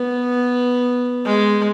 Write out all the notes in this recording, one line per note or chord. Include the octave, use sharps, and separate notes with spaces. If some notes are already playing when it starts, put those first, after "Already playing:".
Already playing: B3
G#3